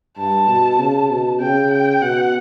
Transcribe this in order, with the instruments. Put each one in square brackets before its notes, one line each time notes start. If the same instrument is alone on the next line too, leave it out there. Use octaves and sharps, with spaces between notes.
[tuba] G2 [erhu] A5
[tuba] B2
C#3
B2
[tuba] C#3 [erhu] G5
[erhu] G5
[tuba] B2 [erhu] F#5